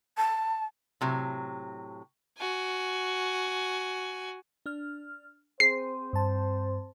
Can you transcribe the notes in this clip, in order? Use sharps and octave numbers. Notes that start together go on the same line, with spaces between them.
A5
A2 C3 F#3
F#4 G#5
D4 F6
C4 G#4 C5 C7
G2 A5